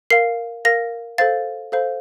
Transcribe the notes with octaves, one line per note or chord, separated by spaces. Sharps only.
A#4 F5 C7
A#4 F5 A#6
A4 C5 F5 A6
A4 C5 F5